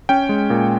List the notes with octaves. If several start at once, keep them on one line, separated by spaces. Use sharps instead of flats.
C#4 G5
G#3
A#2